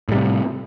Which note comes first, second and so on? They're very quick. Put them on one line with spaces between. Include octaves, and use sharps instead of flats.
A2 G3 C3